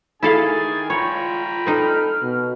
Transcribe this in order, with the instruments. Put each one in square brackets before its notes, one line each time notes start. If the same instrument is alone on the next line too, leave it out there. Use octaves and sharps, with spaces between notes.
[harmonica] D#3 G#4 G#5 [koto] E4 A4 F5 [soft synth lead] A6
[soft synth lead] F4 [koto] C#5 [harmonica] G5 A#5 B5
[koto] C4 D#4 [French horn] A4 [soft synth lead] F6
[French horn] B2